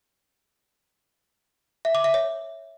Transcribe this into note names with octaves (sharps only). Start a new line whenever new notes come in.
E5
D6
E5
C#5